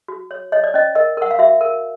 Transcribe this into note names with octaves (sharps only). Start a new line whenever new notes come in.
F#4
C#5
C#5 D#5
D5
C#4 D#5
A#4 D#5
A#4 F#5
F5
F#4 E5
A#4